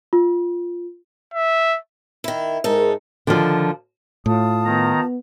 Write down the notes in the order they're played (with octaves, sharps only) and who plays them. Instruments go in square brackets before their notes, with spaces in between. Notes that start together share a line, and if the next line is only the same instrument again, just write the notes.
[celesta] F4
[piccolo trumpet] E5
[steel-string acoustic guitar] D#3 E4
[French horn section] G#2 G#3 A#4 [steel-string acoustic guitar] D#4 A4
[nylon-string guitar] D3 D#3 F3
[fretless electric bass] A2 [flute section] F4 A5 D#6
[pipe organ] D#3 A#5 [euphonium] B3